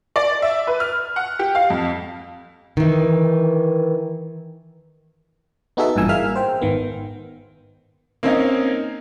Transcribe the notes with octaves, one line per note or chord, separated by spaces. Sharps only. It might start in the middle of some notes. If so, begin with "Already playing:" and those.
D5
E5
B4
F6
F#5
G4
F5
F2
D#3 E3
B3 D#4 F#4 G#4 A4 E5
G#1 G2 A#2 E3 G#5 E6
G#4 A#4 E5 F5 F6
C5 G5
G#1 D#3 B3
A#3 C4 C#4 D#4